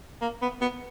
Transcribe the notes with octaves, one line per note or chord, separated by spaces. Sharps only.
A#3
B3
B3